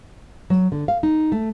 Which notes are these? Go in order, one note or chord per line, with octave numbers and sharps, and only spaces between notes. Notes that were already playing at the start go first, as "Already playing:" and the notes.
F#3
D3
F5
D#4
A3